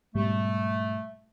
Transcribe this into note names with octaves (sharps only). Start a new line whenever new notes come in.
G#2 B2 G3 A3